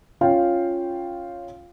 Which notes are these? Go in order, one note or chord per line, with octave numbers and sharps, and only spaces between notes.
C#4 F4 F5 G5